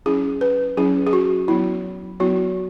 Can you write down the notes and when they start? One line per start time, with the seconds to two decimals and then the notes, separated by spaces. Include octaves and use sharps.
0.06 F#3 C#4 E4 G#4
0.41 B4
0.77 F#3 C#4 E4 G#4
1.07 G#4
1.13 F#4
1.48 F#3 B3 E4
2.20 F#3 B3 E4 F#4